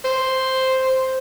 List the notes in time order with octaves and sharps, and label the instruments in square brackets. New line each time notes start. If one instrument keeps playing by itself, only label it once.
[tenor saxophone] C5